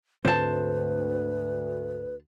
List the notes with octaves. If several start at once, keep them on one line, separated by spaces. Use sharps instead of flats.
D2 G#2 D3 C4 B4 C5 A5